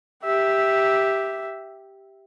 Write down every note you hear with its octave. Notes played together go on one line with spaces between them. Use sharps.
G4 E5